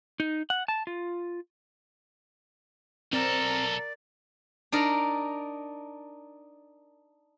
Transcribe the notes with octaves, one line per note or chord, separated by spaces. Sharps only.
D#4
F#5
A5
F4
B1 C4 A4 A#4 D5
D4 D#4 A#4 D5